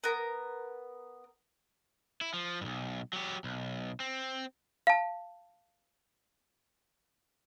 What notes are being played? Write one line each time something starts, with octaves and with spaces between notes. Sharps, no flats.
B3 A#4
E4
F3
B1 G2
F#3 G4
B1
C4
F5 A5